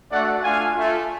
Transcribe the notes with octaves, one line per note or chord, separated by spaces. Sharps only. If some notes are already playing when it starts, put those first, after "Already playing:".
A3 D4 F#4 D5 F#5
A3 D4 F4 F5 G#5
A3 F4